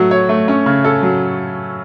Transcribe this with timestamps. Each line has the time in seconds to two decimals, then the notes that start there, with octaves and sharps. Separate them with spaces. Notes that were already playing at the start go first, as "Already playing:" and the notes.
Already playing: F#3 A3 F#4
0.11 C#5
0.29 A3
0.48 C#4
0.66 C#3
0.84 A4
1.03 F#3